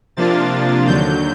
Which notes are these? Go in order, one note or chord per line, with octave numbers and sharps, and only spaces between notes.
C3 F3 A#3 D4 F4 A6
D#2 D3 F#3 G6